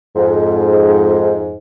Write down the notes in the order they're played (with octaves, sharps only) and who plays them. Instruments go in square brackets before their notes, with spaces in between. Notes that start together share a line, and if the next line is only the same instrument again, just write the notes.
[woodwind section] F2 G#2